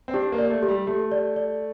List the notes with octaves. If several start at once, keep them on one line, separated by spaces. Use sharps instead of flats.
C4
D4 G4
A#3
D5
A3
G4
G3
A3 G4
D5
D5